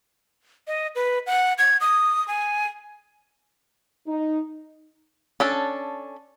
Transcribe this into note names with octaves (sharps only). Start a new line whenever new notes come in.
D#5
B4
F#5
G#6
D#6
G#5
D#4
C#4 D4 A4